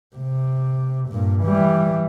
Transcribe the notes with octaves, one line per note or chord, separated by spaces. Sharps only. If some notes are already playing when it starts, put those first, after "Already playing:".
C3
G2 A#2
E3 G3